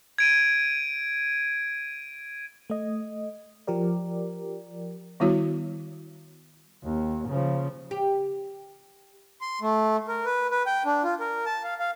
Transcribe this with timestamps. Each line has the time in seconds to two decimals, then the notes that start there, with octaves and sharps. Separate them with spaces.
0.18 G#6 D7 D#7
2.70 A3 D#5
3.67 F3 G4 A#4 D5
5.20 D#3 G3 B3 E4 F#4 C#5
6.84 D#2
7.28 C#3 F3
7.91 G4
9.41 C6
9.61 A3
10.08 A#4
10.25 B4
10.51 B4
10.66 G5
10.85 D4
11.03 F4
11.20 A#4
11.46 A5
11.64 F5
11.80 F5